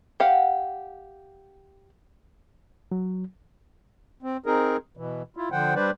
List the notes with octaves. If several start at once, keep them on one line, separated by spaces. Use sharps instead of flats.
G4 F5 F#5
F#3
C4
C4 D#4 G#4 A#4
B2 E3
E4 F4
D3 F3 C5 F#5 G5
G3 D4 B4 C5 D5